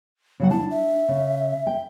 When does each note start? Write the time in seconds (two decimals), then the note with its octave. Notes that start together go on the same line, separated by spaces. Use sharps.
0.40 C#3 F#3 F#5
0.51 D4 E4 A5
0.71 E5
1.08 C#3
1.67 G5